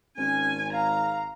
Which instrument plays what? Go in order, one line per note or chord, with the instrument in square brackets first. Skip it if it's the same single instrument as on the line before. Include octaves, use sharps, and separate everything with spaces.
[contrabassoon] G#1 [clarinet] C#4 [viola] G#5
[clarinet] F5 [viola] A#5